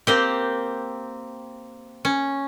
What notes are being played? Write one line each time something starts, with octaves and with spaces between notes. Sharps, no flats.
A#3 C4 G4
C#4